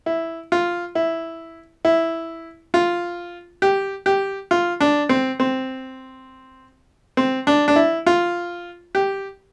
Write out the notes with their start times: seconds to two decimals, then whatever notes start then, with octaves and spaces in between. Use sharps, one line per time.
0.06 E4
0.52 F4
0.95 E4
1.85 E4
2.74 F4
3.62 G4
4.06 G4
4.51 F4
4.80 D4
5.09 C4
5.40 C4
7.17 C4
7.47 D4
7.68 D4
7.76 E4
8.07 F4
8.95 G4